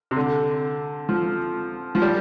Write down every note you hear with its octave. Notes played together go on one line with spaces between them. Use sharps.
C3
D3
F3
F3
G3